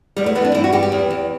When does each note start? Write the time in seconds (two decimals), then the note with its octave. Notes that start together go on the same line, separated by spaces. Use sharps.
0.16 E2 G3
0.26 A3
0.35 E3 B3
0.45 D4
0.54 G2 E4
0.64 F#4
0.73 G2 G4
0.83 G4
0.92 E2
1.10 E2